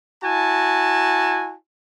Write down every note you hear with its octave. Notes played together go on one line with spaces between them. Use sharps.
E4 F#4 G#5 A5